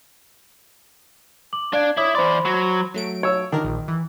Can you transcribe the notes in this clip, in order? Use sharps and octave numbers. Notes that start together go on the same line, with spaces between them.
D6 F#7
D4 D5 F5 G#6
E4 C#5 D6 D#6
E3 C5 D5 B5 C6
F#3
F#3 A3 D7
C#5 E6
D#3 D4 A#4
A#1
E3